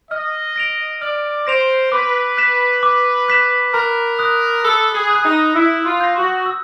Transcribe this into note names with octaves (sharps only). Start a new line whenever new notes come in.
D#5 F6
A#6 D7 F7
D5 F6
C5 A#6 D7 F7
B4 D6
F#6 B6 E7
D6
F#6 B6 E7
A#4 B5
D#6 F#6
A4 B5
G#4
D#6 F#6
D#4
E4 E6
F4
G6 A#6
F#4
E6